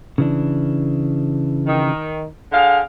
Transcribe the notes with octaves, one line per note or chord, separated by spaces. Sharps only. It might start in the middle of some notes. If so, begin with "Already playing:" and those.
C#3 E3 D4
D#3
D3 G#4 F5